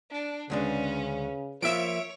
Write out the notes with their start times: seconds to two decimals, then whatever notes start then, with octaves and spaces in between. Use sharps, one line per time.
0.11 D4
0.50 D2 C#3 G#3 C#4 D4 B4
1.62 F3 A#3 F4 C#5 E5 D7